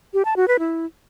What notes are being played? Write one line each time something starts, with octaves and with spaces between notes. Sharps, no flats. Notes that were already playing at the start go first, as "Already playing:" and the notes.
G4
A5
F#4
B4
E4